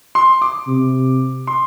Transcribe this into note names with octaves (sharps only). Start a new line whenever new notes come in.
C6
D6
C3
C6